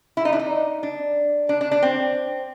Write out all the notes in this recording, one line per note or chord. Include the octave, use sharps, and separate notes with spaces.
E4
D#4
D4
D#4
D4
D4
D4
D4
C4